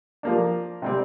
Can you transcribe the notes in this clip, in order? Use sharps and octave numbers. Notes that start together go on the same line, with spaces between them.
F3 A#3 D4
C3 G3 C4